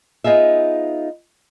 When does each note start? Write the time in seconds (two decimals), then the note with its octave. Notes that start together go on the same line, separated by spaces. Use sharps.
0.24 B3 D#4 F4 G#4 E5